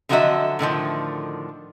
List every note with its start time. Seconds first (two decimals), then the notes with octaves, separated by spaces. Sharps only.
0.09 D3 F3 F#3 F#4 D#5 E5
0.59 A2 D3 D#3 F3